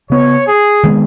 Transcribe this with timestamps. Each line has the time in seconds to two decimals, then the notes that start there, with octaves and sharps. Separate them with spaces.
0.10 C#3 B3 C#5
0.46 G#4
0.83 D#3 G#3 B3